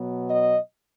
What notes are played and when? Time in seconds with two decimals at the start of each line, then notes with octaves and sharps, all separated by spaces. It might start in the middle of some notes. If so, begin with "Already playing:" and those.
Already playing: B2 F#3 B3
0.30 D#5